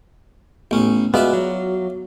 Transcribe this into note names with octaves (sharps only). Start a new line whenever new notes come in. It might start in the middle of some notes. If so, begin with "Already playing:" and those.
A1 B3 C#4
G#3 B3 F4 F#4 D5 E5
F#3